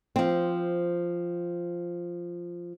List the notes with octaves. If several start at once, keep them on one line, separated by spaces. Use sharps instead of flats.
F3 C4